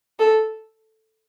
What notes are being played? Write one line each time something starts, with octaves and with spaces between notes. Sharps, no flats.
A4